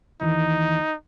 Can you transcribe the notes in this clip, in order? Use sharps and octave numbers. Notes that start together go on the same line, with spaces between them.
D#2 E3 D#4